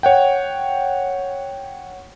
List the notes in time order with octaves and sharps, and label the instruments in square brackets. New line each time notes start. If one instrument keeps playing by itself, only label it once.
[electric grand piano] C#5 F#5 G5